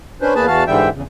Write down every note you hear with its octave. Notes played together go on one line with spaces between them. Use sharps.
C#4 D4 B4 C5
E2 A#3 G#4 B4 A5
E2 E3 F#4 F5 A5
G#2 D3 E3 G3 E5 G5
E2 C#3